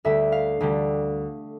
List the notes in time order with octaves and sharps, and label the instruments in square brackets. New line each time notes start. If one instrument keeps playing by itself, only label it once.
[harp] D2 D3 G3 E5
F5
D2 D3 G3